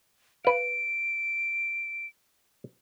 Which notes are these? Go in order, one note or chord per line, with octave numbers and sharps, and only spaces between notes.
B4 F5 D7